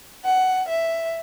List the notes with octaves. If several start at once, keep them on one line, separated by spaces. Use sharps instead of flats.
F#5
E5